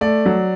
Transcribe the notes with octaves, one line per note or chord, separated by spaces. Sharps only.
A3 D5
F#3